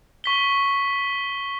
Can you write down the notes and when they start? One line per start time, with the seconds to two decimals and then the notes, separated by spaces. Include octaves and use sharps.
0.24 C#6 B6 G7